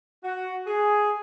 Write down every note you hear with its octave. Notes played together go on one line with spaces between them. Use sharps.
F#4
G#4